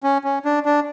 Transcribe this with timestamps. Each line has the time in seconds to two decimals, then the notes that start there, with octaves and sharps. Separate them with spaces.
0.03 C#4
0.24 C#4
0.45 D4
0.65 D4